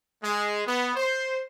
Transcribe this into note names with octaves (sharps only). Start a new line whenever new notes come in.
G#3
B3
C5